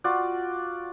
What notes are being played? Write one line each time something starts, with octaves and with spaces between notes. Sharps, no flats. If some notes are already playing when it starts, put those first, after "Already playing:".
F4 F#4 D5